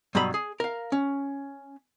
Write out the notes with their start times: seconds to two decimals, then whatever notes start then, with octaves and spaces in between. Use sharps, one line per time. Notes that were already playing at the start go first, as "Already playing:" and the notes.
0.15 G2 B2 F#3 A#5 B5
0.34 G#4
0.60 A#4 F5
0.92 C#4